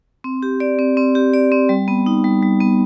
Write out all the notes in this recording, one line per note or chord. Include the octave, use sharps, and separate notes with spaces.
C4
G4
D5
C4
C4
G4
D5
C4
G3
B3
D#4
G3
G3
B3